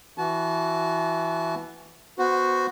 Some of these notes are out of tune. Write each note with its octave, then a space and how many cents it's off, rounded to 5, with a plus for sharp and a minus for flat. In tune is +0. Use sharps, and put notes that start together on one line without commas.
E3 +5 F#4 +0 A5 -30
B3 +0 F#4 +0 C5 -15